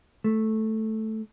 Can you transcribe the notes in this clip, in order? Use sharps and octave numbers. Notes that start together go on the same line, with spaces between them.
A3